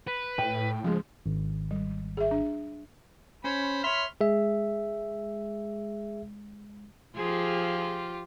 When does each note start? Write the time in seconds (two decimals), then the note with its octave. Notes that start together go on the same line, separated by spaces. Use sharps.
0.08 B4
0.38 A2 G5
0.84 C#2 F3 G#3
1.26 G#1
1.71 G3
2.17 G#4 E5
2.31 D4
3.44 C#4 C5 C#5 B5
3.84 C#5 E5 B5 C6 F6
4.21 G#3 G#4 E5
7.17 F3 F4 G4 G#4